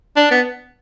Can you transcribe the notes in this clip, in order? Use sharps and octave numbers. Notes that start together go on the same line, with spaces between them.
D4
B3